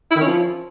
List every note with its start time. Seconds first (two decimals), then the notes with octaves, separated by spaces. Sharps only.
0.11 E4
0.16 D#3
0.21 C#4
0.26 F3